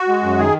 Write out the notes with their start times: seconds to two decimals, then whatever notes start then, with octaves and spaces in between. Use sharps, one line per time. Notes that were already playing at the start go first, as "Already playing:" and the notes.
Already playing: F#4
0.09 G#3
0.23 F#2
0.38 D#3 G#4